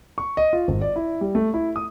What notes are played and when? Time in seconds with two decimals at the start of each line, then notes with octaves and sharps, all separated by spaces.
0.18 C#6
0.37 D#5
0.53 F4
0.68 G#1
0.81 D5
0.96 E4
1.21 G3
1.35 A3
1.54 E4
1.76 D#6